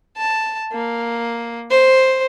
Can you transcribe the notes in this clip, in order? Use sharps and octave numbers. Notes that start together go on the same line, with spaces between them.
A5
A#3
C5